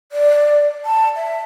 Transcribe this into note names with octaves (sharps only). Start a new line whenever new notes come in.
D5
A5
E5